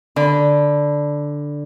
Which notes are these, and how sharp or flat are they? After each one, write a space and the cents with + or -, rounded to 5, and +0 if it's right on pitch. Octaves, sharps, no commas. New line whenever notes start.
D3 +0 B5 +0